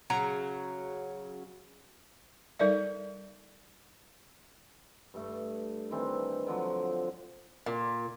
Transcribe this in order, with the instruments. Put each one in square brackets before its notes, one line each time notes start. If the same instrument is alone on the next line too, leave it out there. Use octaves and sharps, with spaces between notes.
[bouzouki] C#3 F#3 A#5
[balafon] G3 D#4 A4 A#4 D5 E5
[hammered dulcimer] G2 A3
D#3 E3 C4 D4
D3 F3 F#3
[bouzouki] A#2